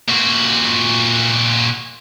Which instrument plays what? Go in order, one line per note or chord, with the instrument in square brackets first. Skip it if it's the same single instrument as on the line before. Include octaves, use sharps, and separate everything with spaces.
[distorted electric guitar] A#2 F#4